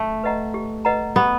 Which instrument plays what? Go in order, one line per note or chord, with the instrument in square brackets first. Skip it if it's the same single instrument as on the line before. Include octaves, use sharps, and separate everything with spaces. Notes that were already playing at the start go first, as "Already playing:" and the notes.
Already playing: [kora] A3
[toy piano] B4 D#5 F#5 A#5
G4
B4 D#5 F#5 A#5
[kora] B3 [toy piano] G4